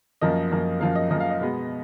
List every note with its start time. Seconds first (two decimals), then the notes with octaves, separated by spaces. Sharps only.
0.21 F#2 F3 A#3 D#5
0.51 F#2 F3 A#3
0.81 F#2 F3 A#3 F5
0.95 D#5
1.10 F#2 F3 A#3 D#5
1.20 F5
1.30 D#5
1.40 B2 G#3 B3